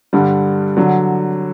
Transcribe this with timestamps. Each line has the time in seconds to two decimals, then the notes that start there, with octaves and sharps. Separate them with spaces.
0.13 G2 D3 G3
0.77 D3 F#3